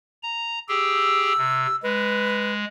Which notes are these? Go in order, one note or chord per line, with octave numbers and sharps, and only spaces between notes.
A#5
G4 G#4 G5 E6
C3
G#3 B4